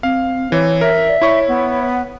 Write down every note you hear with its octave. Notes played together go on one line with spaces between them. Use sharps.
C4 F5
E3 C#5
A#4 E5
D5
E4 C#5 C#6
B3